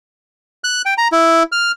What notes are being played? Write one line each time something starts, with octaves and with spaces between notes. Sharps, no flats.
F#6
G5
A#5
E4
F6